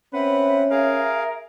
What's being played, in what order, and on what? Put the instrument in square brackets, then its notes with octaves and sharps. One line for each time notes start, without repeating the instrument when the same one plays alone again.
[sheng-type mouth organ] C4 F#5 [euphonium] C#4 [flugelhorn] B4 [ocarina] E5
[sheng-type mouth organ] G#4 F5 [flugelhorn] A#4